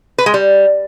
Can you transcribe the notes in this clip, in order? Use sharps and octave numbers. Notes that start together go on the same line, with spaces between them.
B4
G#3
G3